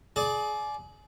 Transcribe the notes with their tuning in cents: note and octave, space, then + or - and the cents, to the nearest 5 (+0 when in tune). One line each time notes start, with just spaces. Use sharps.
G#4 +30 D5 +0